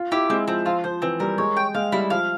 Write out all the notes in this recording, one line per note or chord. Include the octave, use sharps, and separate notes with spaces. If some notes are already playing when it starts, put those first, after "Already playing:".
Already playing: F4
E4 G4
G#3 C4
F3 C4
F3 F4
F3 C5
E3 C4
G3 A#4
G#3 C#5
G5
G#3 F5
G3 E4
F3 F5